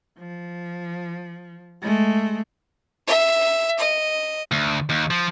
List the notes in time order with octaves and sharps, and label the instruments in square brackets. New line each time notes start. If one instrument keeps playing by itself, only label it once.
[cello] F3
G#3 A3
[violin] E5
D#5
[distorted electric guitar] D2
D#2
F3